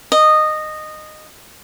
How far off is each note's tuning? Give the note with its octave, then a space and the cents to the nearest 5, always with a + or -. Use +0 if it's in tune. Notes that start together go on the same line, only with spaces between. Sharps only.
D#5 -15